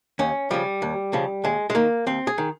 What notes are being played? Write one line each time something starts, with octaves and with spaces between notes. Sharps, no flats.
D#2 C#4
C#3 F3 G3
D#2
C#3 F3
D#2 G#3
G#3
D#3 A#3
D#2 C4
G#4
D#3